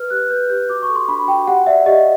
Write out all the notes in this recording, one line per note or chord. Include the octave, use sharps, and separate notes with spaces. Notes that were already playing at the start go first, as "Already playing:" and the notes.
Already playing: B4 F6
G4 F#6
B4 G6
G4 G6
F#4 D6
C#6
A4
C6
D4 B5
F#4 G5
G4 F#5
D5 E5
G4 D#5